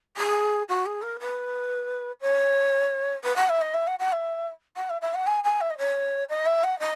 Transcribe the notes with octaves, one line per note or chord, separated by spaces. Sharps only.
G#4
F#4
G#4
A#4
B4
C#5
B4
F#5
E5
D#5
E5
F#5
F#5
E5
F#5
E5
E5
F#5
G#5
G#5
E5
D#5
C#5
D#5
E5
F#5
D#5